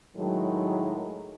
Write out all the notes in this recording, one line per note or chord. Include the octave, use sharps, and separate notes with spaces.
A2 D#3 F#3 G#3